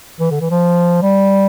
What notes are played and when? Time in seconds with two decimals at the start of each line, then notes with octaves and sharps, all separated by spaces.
0.20 E3
0.31 D3
0.41 E3
0.51 F3
1.02 G3